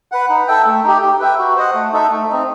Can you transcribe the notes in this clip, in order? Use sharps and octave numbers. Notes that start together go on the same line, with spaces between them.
B4 F#5
D#4
A4 E5 G5
A3
D#4 G4
G4
B4 E5 G5
F#4
C5 D#5 F#5
A3
D#4 A4 E5
A3
C4 D#4